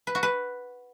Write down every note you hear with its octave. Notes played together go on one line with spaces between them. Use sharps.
B4
F#4
B4